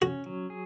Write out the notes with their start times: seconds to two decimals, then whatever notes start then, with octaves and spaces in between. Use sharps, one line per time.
0.02 C#4 F#4
0.26 F#3
0.50 G#4